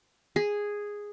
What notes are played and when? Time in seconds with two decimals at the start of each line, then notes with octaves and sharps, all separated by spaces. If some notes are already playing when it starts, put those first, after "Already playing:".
0.36 G#4